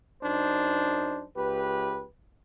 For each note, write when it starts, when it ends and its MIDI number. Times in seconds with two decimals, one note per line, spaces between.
0.22 1.25 42
0.22 1.25 62
0.22 1.25 63
0.22 1.25 72
1.36 2.04 37
1.36 2.04 67
1.36 2.04 71